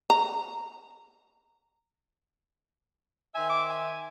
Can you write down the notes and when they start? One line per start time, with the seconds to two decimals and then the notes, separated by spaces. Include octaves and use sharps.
0.10 A#5
3.35 D#3 C5 E5 G#5
3.50 D6
3.69 G#5